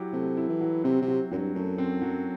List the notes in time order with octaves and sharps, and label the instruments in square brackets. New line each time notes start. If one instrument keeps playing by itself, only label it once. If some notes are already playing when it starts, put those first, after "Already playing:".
Already playing: [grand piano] F#3 E4 G4
[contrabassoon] C3 [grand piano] A3
[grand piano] E4
[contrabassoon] E3
[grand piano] F#3
[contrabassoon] C3 [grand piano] C4
[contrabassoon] C3
[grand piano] F#3
[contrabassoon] F#2 [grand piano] F#3
[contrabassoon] G2
[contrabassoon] F#2 [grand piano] A3
[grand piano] C4
F#3